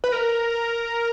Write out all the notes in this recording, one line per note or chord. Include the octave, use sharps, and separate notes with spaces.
B4
A#4